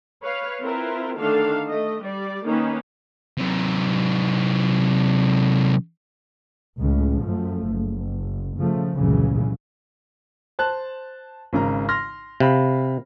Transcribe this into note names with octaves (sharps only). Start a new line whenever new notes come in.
B4 C#5 F5
C4 E4 F4 A#4 B4
D3 D#3 A3 D4 A4 F5
A3 D#5
G3 D5
D#3 A#3 C#4 D#4 B4
C3 F#3
C#2 A2 C#3
F#2 F3 A3
F#1
C#3 F3 A3
F1 C#2 A#2 C#3 E3 F#3
C5 A5 F#6
G#1 C#3 A#5
C6 F6 A#6
C3 F5 B5